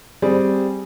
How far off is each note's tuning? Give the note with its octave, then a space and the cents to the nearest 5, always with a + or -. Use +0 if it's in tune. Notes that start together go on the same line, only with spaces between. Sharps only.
G3 +0 C4 +0 G#4 +0